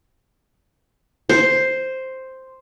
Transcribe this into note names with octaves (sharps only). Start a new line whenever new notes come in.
C5